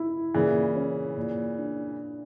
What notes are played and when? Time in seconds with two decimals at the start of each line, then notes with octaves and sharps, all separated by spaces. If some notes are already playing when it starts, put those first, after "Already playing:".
Already playing: E4
0.34 A#2 C#3 E3
0.76 C#4
1.17 A#2
1.59 D4